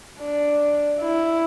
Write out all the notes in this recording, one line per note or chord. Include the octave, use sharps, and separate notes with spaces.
D4
E4